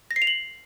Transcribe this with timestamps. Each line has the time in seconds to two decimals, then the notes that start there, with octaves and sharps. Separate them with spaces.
0.11 A#6
0.16 C7
0.22 F7
0.27 F#7